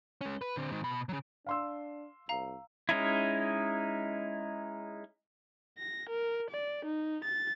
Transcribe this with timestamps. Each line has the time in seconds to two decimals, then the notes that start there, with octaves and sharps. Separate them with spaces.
0.21 G#3 C#4
0.41 B4
0.57 D3 C4
0.71 G#2 D#3
0.84 B2 B5
1.09 C#3 F#3
1.46 D4 F5 C6 E6
2.29 C2 F5 A#5
2.89 G#3 C#4 D#4 E4
5.78 A#6
6.09 A#4
6.50 D5
6.85 D#4
7.24 A6